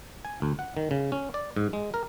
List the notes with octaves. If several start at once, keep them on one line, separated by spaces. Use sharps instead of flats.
G#5
D2
F#5
D#3
C#3
C#4
D5
G#2
G#3
A#4